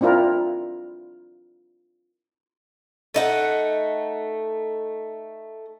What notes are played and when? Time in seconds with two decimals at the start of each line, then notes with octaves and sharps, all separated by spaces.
0.01 C4 D4 E4 F4 A#4
3.14 A3 D#4 F#5